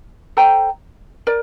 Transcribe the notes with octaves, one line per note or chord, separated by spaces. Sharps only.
A4 C5 G5 A#5
A#4 D5